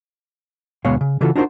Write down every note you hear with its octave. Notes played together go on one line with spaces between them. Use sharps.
D2 B2 G#3 B3 C#5 F5
C#3
C#3 E3 F4 F#4 A4
D4 D#4 F4 F#4 A#4 C5